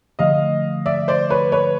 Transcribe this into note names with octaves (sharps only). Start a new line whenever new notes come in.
D3 F3 A3 D#5 F5
D5 E5
C5 D5
B4 C#5
B4 C#5